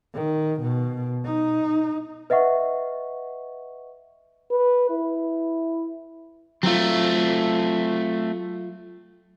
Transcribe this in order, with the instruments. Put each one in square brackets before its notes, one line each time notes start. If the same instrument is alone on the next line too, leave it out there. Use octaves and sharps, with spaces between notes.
[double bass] D#3
B2
D#4
[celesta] B4 D#5 E5 F#5 C#6
[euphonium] B4
E4
[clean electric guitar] F#3 F4 [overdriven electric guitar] A3 C4